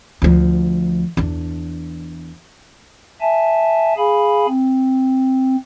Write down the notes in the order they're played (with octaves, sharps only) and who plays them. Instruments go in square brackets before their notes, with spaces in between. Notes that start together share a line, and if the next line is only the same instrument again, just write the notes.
[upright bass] D2 F3
E2 D4
[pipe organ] E5 G#5 A5
G#4 F5 G#5 B5
C4